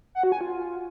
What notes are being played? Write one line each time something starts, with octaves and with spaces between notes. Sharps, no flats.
F#5
F#4
G#5
F4